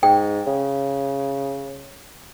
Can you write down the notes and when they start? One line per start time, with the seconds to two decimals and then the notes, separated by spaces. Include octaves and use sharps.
0.03 G#2 G5
0.47 C#3